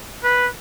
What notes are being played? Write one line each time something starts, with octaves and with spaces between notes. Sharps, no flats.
B4